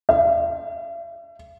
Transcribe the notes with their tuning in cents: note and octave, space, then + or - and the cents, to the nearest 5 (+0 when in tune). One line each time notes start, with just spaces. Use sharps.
E5 +45